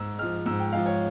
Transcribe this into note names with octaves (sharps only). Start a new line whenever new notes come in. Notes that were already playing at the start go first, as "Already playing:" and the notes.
Already playing: G#2 E6
F3 G#3 F6
G#2 E6
G5
F3 G#3 F5
C#5